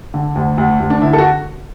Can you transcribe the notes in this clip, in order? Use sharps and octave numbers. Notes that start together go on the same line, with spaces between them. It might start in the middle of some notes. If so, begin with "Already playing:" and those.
D3
D2
D2
D2
D4
D3 E4
A4
F#4